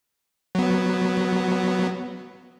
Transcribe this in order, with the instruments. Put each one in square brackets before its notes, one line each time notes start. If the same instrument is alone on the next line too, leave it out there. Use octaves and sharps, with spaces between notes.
[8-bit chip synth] F#3 B3